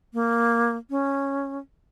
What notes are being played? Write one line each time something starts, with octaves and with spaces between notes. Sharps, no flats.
A#3
C#4